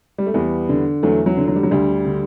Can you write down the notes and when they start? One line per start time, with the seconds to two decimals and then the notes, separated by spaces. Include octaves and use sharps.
0.18 G3
0.26 A3
0.34 E2 G3 B3
0.69 D3
1.03 E2 F#3 A3
1.26 F#3
1.37 D3
1.48 F#3
1.56 G3
1.63 F#3
1.71 D2 G3
2.05 D3